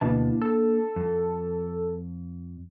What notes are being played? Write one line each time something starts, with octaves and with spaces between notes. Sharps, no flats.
D2 B2 E3 A#3 D4 A5
A4
F2